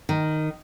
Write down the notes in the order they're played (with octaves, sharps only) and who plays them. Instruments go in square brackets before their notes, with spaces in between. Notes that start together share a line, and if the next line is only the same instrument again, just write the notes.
[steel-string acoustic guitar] D#3